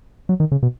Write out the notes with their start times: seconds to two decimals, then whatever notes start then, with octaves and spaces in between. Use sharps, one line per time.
0.29 F#3
0.40 D#3
0.52 C#3
0.63 B2